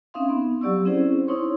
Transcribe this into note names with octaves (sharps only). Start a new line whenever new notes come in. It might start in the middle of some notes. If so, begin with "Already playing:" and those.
C4 C#4 D#4 E5 F5 C6
B3
F#3 G4 D5 C#6 E6
C4 C#4 E4 G#4 C5
D#4 E4 C#5 C6 C#6